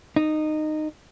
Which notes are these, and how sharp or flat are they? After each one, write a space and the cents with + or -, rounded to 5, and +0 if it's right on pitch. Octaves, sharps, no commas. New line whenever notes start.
D#4 -15